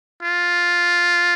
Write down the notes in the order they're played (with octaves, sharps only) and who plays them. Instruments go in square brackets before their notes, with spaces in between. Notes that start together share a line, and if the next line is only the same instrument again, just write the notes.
[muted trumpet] F4